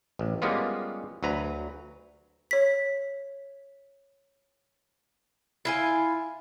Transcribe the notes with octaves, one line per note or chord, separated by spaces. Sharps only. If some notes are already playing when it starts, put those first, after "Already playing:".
A1
G3 G#3 A#3 B3 C#4 F4
D2 F#3 B4 A#5
C#5 B6
E4 F4 G#5